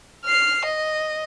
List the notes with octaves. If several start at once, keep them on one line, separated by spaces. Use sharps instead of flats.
F6 C7
D#5